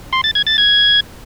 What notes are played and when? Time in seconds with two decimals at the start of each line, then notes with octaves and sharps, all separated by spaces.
0.13 C6
0.24 A6
0.35 G#6
0.47 A6
0.58 G#6